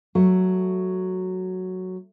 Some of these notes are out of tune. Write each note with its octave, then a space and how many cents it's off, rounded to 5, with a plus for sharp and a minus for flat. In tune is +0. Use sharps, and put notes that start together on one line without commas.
F#3 +0 A3 +0